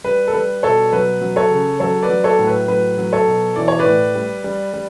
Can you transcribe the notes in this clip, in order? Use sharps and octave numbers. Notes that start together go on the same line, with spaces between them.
G3 B4
A4
G3 B4
B2 A4 C#5
F#3 B4
F#3
A4 C#5
C#3
F#3 A4 C#5
B4 D5
F#3
A4 C#5
A2
B4
F#3 B4
F#3
A4 C#5
B2
E3 D5
C#5
B4 D5
A2
G3
G3
G3